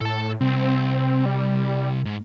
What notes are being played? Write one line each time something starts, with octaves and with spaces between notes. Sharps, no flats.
A2 A4 A5
C2 C4
G3
G#2